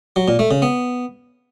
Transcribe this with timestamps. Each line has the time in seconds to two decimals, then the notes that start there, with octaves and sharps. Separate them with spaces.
0.16 F#3
0.28 A#2
0.39 A3
0.51 C#3
0.62 B3